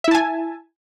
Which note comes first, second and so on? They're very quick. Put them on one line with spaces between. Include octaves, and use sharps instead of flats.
E5 E4 A5 G#5